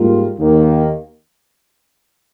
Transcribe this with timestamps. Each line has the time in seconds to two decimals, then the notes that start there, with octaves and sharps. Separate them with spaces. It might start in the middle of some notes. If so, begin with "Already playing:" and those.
Already playing: G#2 G3 A#3 F4
0.38 D#2 D#3 A#3